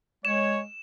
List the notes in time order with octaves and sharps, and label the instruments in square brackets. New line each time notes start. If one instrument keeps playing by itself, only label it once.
[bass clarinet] G#3 [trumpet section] C#5 [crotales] E7